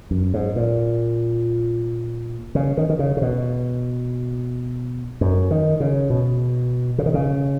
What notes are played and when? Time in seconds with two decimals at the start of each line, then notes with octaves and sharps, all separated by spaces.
0.11 F#2
0.34 G#2
0.56 A#2
2.55 C#3
2.77 D#3
2.89 D#3
2.99 C#3
3.17 C#3
3.22 B2
5.21 F#2
5.51 D#3
5.80 C#3
6.10 B2
6.98 C#3
7.06 D#3
7.14 C#3